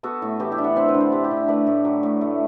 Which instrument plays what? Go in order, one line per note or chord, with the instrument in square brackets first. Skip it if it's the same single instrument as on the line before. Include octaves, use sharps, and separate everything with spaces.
[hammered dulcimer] B3 F#4 A4
A2
E3 G4 B4
E4 G4
D4
D5 F#5
C4 C5 E5
B4 D5
D3
A4 C5
A3 G4 B4
E4 G4
D3
E4
A3 B4 D5
A2
F#3
A2
A3